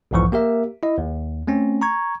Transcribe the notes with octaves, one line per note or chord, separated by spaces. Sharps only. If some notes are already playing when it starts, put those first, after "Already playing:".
B1 E2 G#2 E3 F3 C#6
A#3 G4 A#4 E5
E4 D#5
D#2
A3 C4 C#4
A#5 C#6 G#6